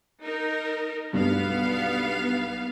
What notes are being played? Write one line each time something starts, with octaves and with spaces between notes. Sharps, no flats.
D#4 A#4
B1 G2 B3 F5